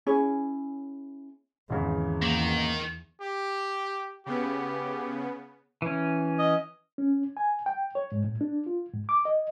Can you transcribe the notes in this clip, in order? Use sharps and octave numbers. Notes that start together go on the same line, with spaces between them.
C#4 E4 G#4 C#5
G#1 E2 C#3
D#3 A#3
G4
C#3 B3 G4
E3 C#4
D#5
C#4
G#5
G5
C#5
G#2
A2
D4
F4
G#2
D6
D#5